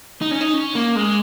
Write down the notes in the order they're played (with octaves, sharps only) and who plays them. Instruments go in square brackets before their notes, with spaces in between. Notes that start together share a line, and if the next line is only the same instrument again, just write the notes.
[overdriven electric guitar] D#4
C#4
D#4
C#4
A#3
G#3